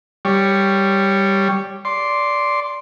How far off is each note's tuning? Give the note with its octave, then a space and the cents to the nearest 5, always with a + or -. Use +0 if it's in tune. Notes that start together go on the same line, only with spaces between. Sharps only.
G3 +0 C#5 +0
D5 -10 C6 +0